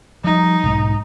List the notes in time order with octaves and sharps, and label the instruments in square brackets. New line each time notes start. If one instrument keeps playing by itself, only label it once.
[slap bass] F3 G3 [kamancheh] D#4
[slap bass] B1 G#2